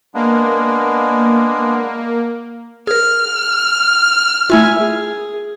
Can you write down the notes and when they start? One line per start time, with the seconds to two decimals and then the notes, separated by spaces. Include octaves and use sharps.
0.14 G#3 A#3 B3 D4
2.87 G#4 A#4 F6
4.50 A3 E4 F4 E5 G#5
4.79 G#4